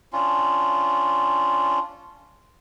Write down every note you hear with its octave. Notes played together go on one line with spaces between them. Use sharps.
C#4 D4 F4